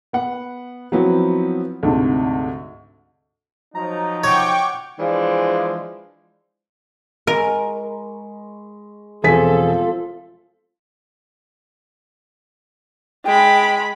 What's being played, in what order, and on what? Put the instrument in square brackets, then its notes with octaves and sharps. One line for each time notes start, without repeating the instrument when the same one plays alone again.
[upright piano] B3 F#5
F3 F#3 B3 C4 E4
D2 G#2 C3
[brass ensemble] F3 F#3 D#4 [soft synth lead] A#5
[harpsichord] C#5 [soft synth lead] F#5 [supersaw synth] G5 C#6 D6
[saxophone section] E3 F3 G#3 D4
[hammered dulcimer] G#3 B5 C#6 [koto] A#4
[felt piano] E1 G#4 B6 [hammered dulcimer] C3 F3 [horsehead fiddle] A4
[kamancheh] G#3 B5 [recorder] G5